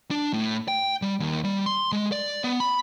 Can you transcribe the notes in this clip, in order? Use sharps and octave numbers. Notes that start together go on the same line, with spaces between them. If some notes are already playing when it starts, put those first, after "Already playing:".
D4
A2
G5
G3
D#2
G3
C6
G#3
D5
B3
B5